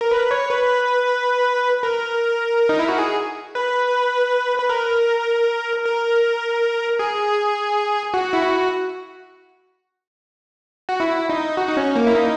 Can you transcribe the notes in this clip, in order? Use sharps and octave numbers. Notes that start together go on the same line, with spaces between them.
A#4
B4
C#5
B4
A#4
D#4
E4
F#4
G#4
B4
B4
A#4
A#4
G#4
F#4
E4
F#4
F#4
E4
D#4
F#4
D#4
C#4
A#3
E4
D#4